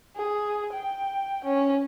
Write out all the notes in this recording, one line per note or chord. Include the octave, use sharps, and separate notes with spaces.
G#4
G5
C#4